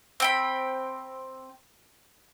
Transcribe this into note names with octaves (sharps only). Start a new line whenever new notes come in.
C4 G5 B5